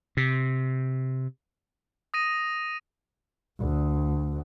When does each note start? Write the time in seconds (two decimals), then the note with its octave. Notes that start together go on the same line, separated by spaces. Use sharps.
0.17 C3
2.14 D#6 A#6 D#7
3.60 D2